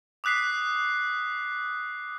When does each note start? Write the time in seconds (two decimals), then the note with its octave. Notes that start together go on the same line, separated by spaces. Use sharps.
0.24 D6 D#6 F#6 B6 C7